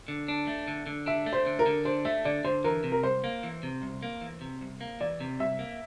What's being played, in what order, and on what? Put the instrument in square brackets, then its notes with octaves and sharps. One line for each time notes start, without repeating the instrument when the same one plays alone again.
[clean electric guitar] D3
D4
A3
D3
D3
[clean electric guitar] D4 [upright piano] E5
[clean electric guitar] A3
[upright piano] C5
[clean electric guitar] D3
[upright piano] A#4
[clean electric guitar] D3
[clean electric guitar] D4 [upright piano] C5
[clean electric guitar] A3 [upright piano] E5
[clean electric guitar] D3 [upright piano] D5
[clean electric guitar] D3 [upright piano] C5
[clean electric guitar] E3 [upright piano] A#4
[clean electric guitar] C3
[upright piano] A#4
[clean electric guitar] C2 [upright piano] C5
[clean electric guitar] A#3
E3
C3
C2
A#3
E3
C3
C2
A#3
[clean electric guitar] E3 [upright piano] D5
[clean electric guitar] C3
[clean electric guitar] C2 [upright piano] E5
[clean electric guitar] A#3